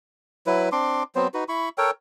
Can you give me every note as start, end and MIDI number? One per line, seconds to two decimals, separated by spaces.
0.47 0.69 54
0.47 0.69 64
0.47 0.69 71
0.72 1.03 60
0.72 1.03 62
0.72 1.03 84
0.72 1.03 86
1.15 1.28 54
1.15 1.28 59
1.15 1.28 60
1.15 1.28 72
1.34 1.44 63
1.34 1.44 66
1.34 1.44 71
1.49 1.69 64
1.49 1.69 83
1.49 1.69 85
1.78 1.91 69
1.78 1.91 70
1.78 1.91 73
1.78 1.91 79